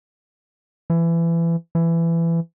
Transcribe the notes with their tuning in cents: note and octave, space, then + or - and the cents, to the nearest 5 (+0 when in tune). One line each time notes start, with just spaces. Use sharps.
E3 +25
E3 +20